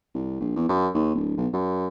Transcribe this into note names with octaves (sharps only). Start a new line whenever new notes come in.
C2
A#1
E2
F#2
D#2
D1
B1
F#2